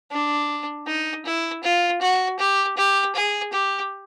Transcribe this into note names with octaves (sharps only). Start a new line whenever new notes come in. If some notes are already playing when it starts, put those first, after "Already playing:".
D4
D#4
E4
F4
F#4
G4
G4
G#4
G4